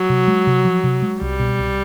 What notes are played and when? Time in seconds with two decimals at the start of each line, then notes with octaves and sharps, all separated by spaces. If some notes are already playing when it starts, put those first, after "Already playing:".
Already playing: F#3
0.09 C3
0.28 G#3
0.47 C3
0.65 F3
0.84 C3
1.02 G#3
1.21 C2 G3
1.40 B2
1.59 C2